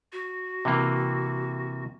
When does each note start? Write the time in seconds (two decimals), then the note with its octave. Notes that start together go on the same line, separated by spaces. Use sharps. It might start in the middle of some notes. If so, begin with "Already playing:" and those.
0.13 F#4
0.65 C3 E3 A#3